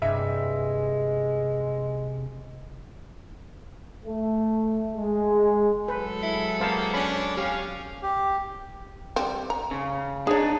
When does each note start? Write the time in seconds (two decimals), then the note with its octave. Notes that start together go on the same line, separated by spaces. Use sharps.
0.02 G2 C3 G#3 E5
4.05 A3
4.96 G#3
5.88 F#3 G#3 A4 B4
6.22 E4
6.61 A#3 B3 C5 F5 A5
6.94 C#4 D4 B5
7.37 C#4 G4 F5
8.03 G4
9.16 G3 C4
9.50 A#5
9.71 C#3
10.27 D4 D#4 G#4 C#5